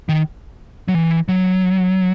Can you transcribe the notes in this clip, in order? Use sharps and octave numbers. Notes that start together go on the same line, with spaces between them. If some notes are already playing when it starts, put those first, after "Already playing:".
D#3
F#3
E3
F#3